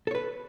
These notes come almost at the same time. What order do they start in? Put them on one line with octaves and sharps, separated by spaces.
A4 C#5 B4